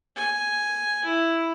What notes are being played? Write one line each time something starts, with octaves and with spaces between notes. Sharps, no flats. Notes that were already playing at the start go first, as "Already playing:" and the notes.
G#5
E4